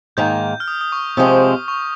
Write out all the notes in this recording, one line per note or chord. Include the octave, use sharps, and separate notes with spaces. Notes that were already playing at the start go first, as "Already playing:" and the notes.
G#2 D#3 A#3 G6
F6
D#6
D#6
C#6
C3 F3 G#3 C4 D#6
C#6